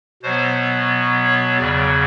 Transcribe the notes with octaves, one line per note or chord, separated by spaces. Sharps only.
B2 F#3 B3 C5
C#5
E2 C#3 F#3 D5